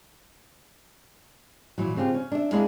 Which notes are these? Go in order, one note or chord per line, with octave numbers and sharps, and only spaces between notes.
A#2 E3 F#3
C#3 C4 F4 G4
C#4
D4 E5
G#3 A#3 D4 E4 G#4 F5